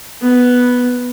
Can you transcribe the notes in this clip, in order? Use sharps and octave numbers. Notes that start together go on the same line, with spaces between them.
B3